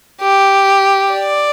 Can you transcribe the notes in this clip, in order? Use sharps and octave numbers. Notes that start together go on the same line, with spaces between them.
G4
D5